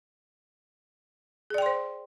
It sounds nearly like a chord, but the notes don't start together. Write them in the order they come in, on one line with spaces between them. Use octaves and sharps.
G#4 D5 G5 C6 C5